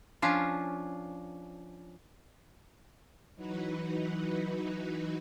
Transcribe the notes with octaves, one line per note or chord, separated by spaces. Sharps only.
F3 C#4 D4 F4
E3 F#3 D#4 F#4 B4